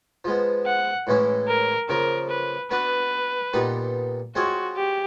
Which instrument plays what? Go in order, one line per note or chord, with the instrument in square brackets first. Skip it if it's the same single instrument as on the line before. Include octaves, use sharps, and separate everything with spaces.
[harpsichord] F3 G#3 B3
[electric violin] F#5
[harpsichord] A2 E3 G#3 C#4 E4
[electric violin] A#4
[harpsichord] C#3 F3 A#3 [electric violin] A#4
[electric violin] B4
[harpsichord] B3 D4 F#4 [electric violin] B4
[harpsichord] A#2 G3 B3 D#4 G4
[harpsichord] G#3 C4 F4 G#4 C#5 [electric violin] F#4
[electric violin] G4